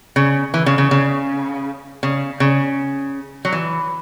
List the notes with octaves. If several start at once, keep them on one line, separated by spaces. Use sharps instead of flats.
C#3
E3
C#3
C#3
C#3
C#3
C#3
F#3
E3